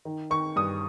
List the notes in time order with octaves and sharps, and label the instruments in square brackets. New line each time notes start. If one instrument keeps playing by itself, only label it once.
[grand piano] D#3
D#3 C#6
G2 D#6